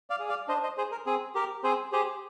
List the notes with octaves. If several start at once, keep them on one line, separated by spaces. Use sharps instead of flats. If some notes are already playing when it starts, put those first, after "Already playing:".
D5 F5
G#4
D5 F5
D4 C5 D#5
C5 D#5
G#4 C5
A#4
C4 G#4
G4 A#4
C4 G#4 C5
G4 G#4 C5